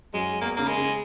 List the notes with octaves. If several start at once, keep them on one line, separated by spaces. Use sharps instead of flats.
F#2 G#3
E2 A#3
C#3 A#3
G#3
C#3